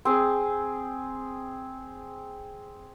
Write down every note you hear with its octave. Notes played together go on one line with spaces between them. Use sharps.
C4 G#4